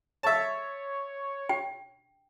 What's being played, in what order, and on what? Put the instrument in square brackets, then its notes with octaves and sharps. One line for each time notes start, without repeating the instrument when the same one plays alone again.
[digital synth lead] C#5 [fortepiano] E5 A5
[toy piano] G5